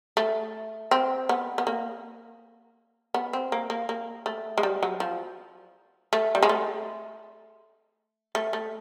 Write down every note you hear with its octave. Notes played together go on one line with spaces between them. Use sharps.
A3
C4
B3
B3
A#3
B3
C4
A#3
A#3
A#3
A3
G#3
G3
F#3
F3
A3
G3
G#3
A3
A3
A3